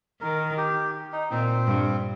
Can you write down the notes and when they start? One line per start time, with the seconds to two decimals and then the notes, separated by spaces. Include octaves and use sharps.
0.21 D#3 A#4
0.58 G4
1.12 D#4
1.31 A#2 C4
1.67 G2